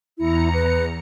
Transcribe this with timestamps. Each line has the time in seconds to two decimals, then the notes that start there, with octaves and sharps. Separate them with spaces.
0.18 E2 E4 A#5 C#7
0.54 B4